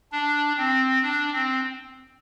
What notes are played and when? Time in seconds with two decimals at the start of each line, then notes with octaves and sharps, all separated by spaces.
0.12 D4
0.58 C4
1.03 D4
1.33 C4